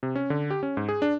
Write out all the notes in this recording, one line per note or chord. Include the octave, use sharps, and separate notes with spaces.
C3
C#4
D3
G4
C#4
G#2
G#4
D4